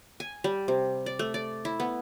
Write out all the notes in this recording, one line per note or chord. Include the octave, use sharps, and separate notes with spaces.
G#5
G3
C3
D5
A3
D5
E4
B3